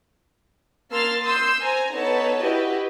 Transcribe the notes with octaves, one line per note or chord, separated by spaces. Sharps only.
A#3 A5 C6 E6 F6 A6
C6 D#6 E6 G6
C5 G#5 A#5
B3 D#4 A4 B4 C#5 A5
E4 F#4 G4 B4 D#5